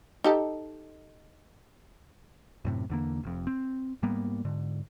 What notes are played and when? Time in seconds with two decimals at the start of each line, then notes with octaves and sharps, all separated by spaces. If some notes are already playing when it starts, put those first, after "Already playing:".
0.24 D#4 G4 A4
2.65 F#2 A2 C3
2.90 E2 D3 A#3
3.24 F1 F2
3.47 C4
4.02 G#2 G3 A#3 B3
4.45 G#2 D3